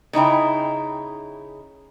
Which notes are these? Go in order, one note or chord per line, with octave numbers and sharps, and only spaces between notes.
C#3 D#4 E4 G5